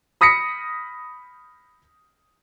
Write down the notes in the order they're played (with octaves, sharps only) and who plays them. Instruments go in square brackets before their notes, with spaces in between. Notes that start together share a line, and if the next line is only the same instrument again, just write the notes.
[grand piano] B5 D#6 A#6 B6 C#7